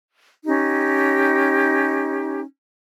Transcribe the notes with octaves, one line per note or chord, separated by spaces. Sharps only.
C#4 D#4 G4